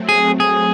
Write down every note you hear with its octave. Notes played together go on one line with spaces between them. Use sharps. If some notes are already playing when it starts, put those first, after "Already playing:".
Already playing: F#3 A3 C4
G#4
G#4